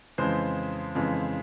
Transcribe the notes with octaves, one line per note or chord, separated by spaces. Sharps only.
F2 C#3 E3 G#3 C5
F2 C#3 E3 G#3